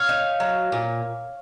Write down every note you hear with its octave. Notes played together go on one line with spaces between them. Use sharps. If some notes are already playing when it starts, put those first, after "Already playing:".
Already playing: C#5 F5
D#4
F#3
A#2